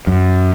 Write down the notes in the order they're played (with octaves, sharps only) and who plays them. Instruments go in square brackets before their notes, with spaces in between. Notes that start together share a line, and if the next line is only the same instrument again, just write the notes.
[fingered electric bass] F#2